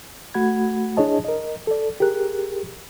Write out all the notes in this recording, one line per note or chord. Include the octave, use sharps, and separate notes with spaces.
A3 F#4 F#5 B5 G#6
D4 E4 G#4 C#5 D#5 A5
A#4 D#5
A4 D5
G4 G#4 A#4 F#6